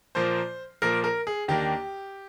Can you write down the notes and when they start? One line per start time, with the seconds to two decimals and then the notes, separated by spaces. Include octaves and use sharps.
0.15 A#2 F3 A#3 C5
0.82 A#2 F3 A#3 A#4
1.04 A#4
1.27 G#4
1.48 D#2 D#3 A#3 D4 G4